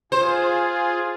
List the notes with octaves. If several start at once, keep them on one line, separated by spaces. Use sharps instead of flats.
F4 G#4 C5